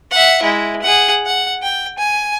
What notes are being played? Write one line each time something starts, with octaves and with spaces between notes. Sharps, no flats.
E5 F#5
G#3 E4
G#4 F#5
F#5
G5
G#5